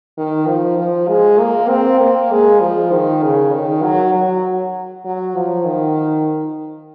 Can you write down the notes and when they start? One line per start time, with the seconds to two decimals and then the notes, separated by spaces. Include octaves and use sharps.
0.18 D#3
0.47 F3
0.78 F3
1.09 G#3
1.39 A#3
1.69 C4
2.00 A#3
2.31 G#3
2.61 F3
2.92 D#3
3.23 C#3
3.52 D#3
3.83 F#3
4.14 F#3
5.05 F#3
5.36 F3
5.65 D#3